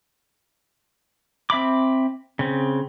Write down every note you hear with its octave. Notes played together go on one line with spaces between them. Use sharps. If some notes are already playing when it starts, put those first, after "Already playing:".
C4 E5 B5 D6
C#3 C4